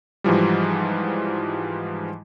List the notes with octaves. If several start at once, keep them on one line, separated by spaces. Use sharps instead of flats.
G#2 E3 F3 G3